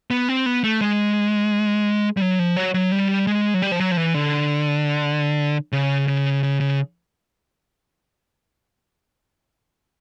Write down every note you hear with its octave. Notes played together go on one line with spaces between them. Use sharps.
B3
C4
B3
A3
G#3
G3
F#3
F3
F#3
F#3
G3
G#3
F#3
G3
F3
F#3
F3
E3
D3
C#3
C#3
C#3
C#3